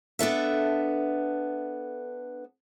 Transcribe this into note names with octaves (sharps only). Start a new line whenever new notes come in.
B3 D4 A4 E5